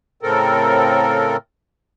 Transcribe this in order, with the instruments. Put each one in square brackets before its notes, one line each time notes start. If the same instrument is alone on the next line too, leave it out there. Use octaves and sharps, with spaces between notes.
[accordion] A2 C#3 C4 A4 A#4